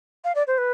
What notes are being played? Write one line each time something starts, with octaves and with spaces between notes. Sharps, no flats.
F5
D5
C5
B4